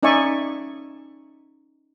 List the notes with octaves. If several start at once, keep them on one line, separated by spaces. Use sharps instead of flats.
C#4 D#4 D5 E5 G#5 C#6